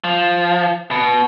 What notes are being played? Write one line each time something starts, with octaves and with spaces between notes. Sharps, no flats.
F3
B2